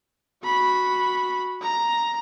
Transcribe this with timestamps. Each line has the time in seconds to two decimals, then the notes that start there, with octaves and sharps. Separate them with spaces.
0.44 F#4 B5
1.62 A#5